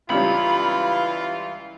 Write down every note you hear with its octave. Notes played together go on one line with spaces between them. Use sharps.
C#2 E3 G3 C#4 F4 F5 B5